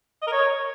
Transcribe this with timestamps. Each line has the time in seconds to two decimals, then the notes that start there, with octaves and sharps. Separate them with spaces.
0.22 D#5
0.27 A#4
0.32 C#5